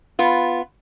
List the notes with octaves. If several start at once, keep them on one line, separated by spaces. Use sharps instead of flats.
B3 F4